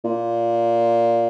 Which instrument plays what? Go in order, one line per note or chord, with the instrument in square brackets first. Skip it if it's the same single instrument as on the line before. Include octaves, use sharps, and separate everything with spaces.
[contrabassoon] A#2